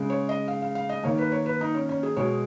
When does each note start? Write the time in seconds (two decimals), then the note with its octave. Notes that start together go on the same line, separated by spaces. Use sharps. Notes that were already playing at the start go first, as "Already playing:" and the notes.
Already playing: C#3 G#3
0.10 C#5
0.29 D#5
0.48 F5
0.62 F5
0.75 F5
0.89 D#5
1.04 D#3 A#3 C#5
1.18 B4
1.32 C#5
1.46 B4
1.61 D#4
1.75 C#4
1.89 C#4
2.03 G#4
2.17 B2 G#3 C#5